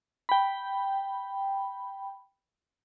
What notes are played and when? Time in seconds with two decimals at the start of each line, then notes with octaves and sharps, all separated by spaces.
0.29 G5 B5